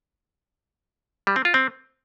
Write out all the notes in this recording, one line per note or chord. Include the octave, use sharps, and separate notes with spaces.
G3
C4
F4
C4